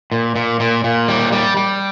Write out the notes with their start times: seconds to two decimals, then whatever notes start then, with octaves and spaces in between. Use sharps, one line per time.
0.12 A#2
0.36 A#2
0.60 A#2
0.84 A#2
1.08 G3
1.32 G3
1.57 G3